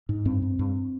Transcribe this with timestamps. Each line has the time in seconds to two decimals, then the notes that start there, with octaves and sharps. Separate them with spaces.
0.09 G#2
0.25 G2 C4
0.42 G2
0.59 G2